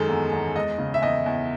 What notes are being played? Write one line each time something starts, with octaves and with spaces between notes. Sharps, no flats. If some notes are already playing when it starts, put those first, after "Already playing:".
Already playing: F#2 D#3 G#3 A4
E2
E2
G#3 D#5
C#3
E5
E2 D#5
E2